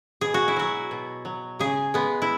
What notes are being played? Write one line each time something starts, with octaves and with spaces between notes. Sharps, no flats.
B2 G#4
F#4
E4
F#3 F#4
B2
F#3
C#3 G#4
G#3 B3
E4